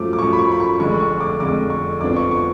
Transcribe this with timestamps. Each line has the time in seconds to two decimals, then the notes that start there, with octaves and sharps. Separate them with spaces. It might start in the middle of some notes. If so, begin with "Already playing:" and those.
Already playing: F#2 F3 A3 D6
0.13 D6
0.19 F#2 F3 A3 C#6
0.33 B5
0.39 C#6
0.52 B5
0.60 C#6
0.80 F1 F2 D3 G#3 C#6
1.00 C#6
1.20 D6
1.40 F1 F2 D3 G#3 D6
1.70 C#6
2.01 F1 F2 F3 B3 D4 D6
2.16 C#6
2.31 C#6